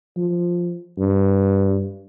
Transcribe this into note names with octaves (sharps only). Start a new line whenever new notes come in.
F3
G2